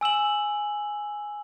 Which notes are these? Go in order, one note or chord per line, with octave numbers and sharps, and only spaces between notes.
G#5 E6 E7 F#7